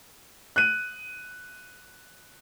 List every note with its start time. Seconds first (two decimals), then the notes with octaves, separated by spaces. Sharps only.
0.56 F#6 D#7